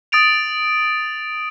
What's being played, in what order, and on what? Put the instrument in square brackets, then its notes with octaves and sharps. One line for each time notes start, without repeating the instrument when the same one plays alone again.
[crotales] D#6 A6 D7 F7